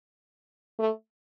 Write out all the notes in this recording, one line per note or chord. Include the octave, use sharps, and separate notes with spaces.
A3